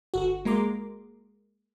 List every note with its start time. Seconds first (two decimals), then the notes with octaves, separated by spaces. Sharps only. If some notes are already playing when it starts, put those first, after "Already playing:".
0.14 G1 F#4
0.45 G#3 A#3 A#5 C6 D6